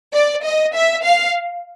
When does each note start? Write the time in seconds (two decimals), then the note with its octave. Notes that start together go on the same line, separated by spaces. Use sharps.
0.13 D5
0.44 D#5
0.74 E5
1.04 F5